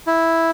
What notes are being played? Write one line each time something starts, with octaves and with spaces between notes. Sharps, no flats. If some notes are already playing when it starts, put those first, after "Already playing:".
E4